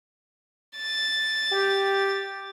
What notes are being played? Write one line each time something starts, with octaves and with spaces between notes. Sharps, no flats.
A6
G4